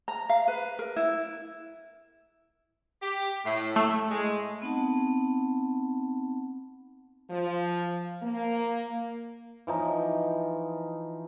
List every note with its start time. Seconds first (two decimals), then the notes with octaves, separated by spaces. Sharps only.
0.08 A#5
0.29 F5
0.48 B4
0.79 A#4
0.96 E4
3.02 G4
3.45 A2
3.76 A3
4.11 G#3
4.62 B3 C4 D#4 F#5 A5
7.30 F3
8.23 A#3
9.67 E3 F3 D#4